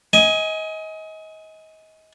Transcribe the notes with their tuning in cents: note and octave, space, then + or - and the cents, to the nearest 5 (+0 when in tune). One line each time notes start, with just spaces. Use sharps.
D#5 +30 G#5 +0